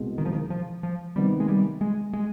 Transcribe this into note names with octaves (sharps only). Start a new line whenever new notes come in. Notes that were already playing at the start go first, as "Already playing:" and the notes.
Already playing: C2 B2 G#3
D#3
F3
D#3
F3
F3
C3 D#3 G3 B3
G#3
G3
G#3
G#3